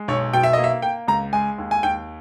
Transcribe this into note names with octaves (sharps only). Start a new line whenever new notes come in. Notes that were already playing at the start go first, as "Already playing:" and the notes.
Already playing: G#3
B1 C#5
B2 G5
E5
A#3 D#5
E5
A#3 G5
C#2 A#5
G#3 G#5
D#2
G#5
D#2 G5